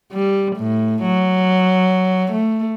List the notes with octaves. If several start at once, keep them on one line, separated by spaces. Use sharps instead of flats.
G3
A2
F#3
A3